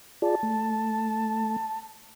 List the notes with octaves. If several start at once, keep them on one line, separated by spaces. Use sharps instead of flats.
F4 G#4 D5 A5
A3